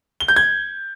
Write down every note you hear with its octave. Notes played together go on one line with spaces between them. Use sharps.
G7
G6
G#6